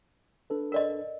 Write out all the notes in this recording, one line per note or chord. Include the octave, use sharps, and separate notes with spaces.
D4 A4 B4
A#4 D5 D#5